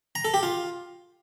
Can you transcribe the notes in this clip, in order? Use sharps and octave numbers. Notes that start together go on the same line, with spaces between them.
A#5
A4
G4
F4